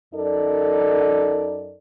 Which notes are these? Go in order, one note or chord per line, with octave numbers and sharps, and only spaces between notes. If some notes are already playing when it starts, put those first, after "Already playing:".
F#2 D#4 A4 A#4 D5